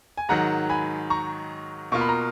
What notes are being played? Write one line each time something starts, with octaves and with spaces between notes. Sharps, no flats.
G#5
G#2 D#3 F#3 F#5 A#5
G#5 B5
A#5 C#6
B2 A#3 F4 C#6
B5
A#5